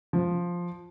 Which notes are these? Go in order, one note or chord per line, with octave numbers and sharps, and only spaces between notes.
F3